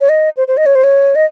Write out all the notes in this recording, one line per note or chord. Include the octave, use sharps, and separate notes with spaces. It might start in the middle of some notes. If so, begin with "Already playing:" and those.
C#5
D#5
C5
C5
D#5
C#5
C5
C#5
D#5